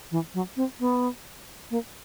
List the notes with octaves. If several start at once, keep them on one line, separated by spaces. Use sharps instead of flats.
E3
F#3
C4
B3
A#3